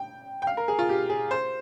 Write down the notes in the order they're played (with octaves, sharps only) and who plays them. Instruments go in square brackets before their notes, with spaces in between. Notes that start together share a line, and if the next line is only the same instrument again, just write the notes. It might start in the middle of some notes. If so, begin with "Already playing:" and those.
Already playing: [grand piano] G5
G5
F5
A#4
G#4
F4
G4
G#4
C5